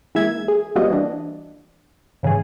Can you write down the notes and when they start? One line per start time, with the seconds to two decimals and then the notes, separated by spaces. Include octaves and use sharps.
0.15 E3 G#3 A#3 E5 G#6
0.48 G#4
0.76 G3 A#3 C4 F4 F#4 D#5
0.90 E3 D4
2.23 G#2 C#3 E3 G#4